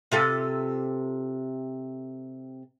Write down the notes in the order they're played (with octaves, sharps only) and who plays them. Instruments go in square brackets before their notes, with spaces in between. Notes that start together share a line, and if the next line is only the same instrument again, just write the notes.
[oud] C3 F4 A4